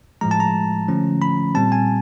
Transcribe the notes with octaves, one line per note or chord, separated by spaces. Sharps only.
A2 F3 G#3 A#5
A5
A#5
D3 F3 A3 C#4
B5
A#2 G3 C4 A5
G#5